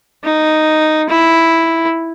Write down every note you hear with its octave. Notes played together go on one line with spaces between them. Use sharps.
D#4
E4